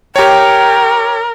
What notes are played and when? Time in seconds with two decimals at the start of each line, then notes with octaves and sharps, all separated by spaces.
0.16 G4 A#4 C#5 G5